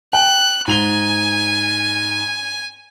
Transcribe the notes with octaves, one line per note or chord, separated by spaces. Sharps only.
G5 F#6
G#2 G#5 F7 G7